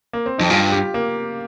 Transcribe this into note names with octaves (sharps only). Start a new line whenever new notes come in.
A#3
C4
F2 D#4
G2 F4
G4
A#3